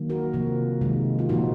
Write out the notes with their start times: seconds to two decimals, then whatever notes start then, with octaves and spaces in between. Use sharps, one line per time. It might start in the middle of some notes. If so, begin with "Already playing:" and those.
Already playing: D#3 F#3 A#3
0.10 F#4 A#4
0.33 C3 F3 A#3
0.81 C3 D#3 G#3
1.19 F4
1.29 A#2 F3 A#3 D#4 F#4